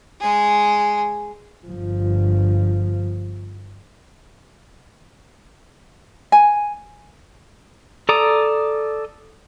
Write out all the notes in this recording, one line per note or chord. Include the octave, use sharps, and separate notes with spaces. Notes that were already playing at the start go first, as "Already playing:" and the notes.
G#3 G#4
G1 F3
G#5
A4 D5 A#5 D#6